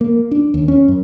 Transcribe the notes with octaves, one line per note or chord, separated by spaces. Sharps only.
A#3
D4
D#2
C#4
F#2